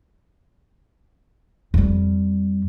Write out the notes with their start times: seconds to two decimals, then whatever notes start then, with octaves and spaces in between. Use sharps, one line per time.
1.74 F2 G3